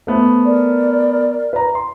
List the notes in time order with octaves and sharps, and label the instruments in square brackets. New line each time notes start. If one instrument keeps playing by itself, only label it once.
[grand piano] A3 B3 C5
[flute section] A#4 D5
[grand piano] B4 A#5
C6